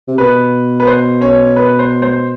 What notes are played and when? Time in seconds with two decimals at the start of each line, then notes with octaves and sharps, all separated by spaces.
0.08 C3
0.18 B2 B4
0.80 B4
0.87 C5
1.21 C#4 C#5
1.56 B4
1.79 C5
2.02 C5